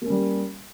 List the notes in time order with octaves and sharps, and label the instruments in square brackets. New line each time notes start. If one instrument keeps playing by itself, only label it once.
[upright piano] A#3
C#4
G3